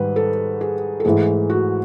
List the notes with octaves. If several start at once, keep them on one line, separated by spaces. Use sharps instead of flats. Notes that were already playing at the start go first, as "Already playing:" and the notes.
Already playing: G#2 D#3 G3 B4
A4
G#4
A4
G#2 E3 A3 G#4
F#4